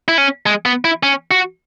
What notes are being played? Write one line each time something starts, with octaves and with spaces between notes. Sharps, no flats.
E4
C#4
G#3
B3
E4
C#4
F#4